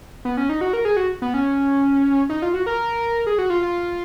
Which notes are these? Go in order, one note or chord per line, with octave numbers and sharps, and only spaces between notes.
B3
C#4
D#4
F#4
A#4
G#4
F#4
B3
C#4
D#4
F4
F#4
A#4
G#4
F#4
F4
F4